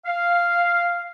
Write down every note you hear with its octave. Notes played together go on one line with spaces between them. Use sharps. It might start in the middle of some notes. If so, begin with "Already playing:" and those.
F5